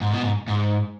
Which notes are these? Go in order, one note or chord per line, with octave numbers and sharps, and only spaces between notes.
G#2
B2
G#2
G#2